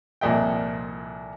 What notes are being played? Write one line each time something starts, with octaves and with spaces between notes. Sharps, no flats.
C2 F2 A#2 D#5 G5